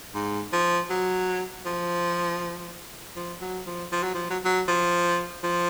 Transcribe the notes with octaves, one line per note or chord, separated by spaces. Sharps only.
G#2
F3
F#3
F3
F3
F#3
F3
F3
F#3
F3
F#3
F#3
F3
F3